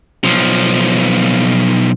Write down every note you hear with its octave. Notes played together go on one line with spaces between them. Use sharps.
B1 F3